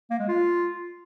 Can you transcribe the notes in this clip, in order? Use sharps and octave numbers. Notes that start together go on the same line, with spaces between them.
A#3
G#3
F4